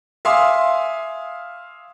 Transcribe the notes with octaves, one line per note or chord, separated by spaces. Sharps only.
E5 F5 G#5 C6 D6 D#6